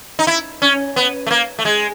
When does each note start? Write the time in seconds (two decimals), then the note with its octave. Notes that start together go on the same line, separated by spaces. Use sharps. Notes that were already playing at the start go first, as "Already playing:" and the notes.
0.19 D#4
0.27 E4
0.62 C#4
0.96 B3
1.27 A3
1.31 A#3
1.59 A3
1.65 G#3